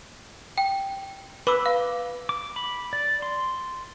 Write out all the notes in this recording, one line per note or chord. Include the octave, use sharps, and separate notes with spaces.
G5
B4 D6 E6
F5
D6
B5
D5
C6